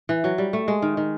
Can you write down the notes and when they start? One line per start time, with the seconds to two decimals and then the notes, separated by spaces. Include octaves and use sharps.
0.09 E3
0.24 F#3
0.38 G3
0.53 A3
0.68 G#3
0.82 D#3
0.97 D#3